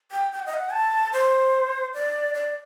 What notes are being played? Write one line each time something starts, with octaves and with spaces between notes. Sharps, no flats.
G5
G5
F#5
D#5
F#5
A5
C5
D5
D5